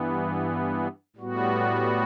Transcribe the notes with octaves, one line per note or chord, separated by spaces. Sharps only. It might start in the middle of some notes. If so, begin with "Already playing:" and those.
Already playing: G2 E3 B3
A2 G3 B3 F#4